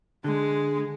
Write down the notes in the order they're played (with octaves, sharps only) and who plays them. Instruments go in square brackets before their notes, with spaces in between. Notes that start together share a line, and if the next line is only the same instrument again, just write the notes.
[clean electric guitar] D3 [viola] G#3